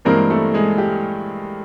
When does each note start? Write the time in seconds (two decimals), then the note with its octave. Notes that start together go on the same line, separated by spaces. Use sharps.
0.05 G2 E3 G#3 A#3 C4 A#4
0.30 A3 A4
0.54 G#3 G#4
0.78 G4